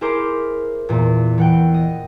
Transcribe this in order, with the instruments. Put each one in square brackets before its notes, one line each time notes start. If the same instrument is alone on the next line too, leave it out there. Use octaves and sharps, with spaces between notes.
[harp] E4 G#4 A#4 C5 D6
E2 A#2
E3 F#5 G5
D#5